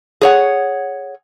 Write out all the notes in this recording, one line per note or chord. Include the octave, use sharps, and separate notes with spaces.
G#4 C#5 F#5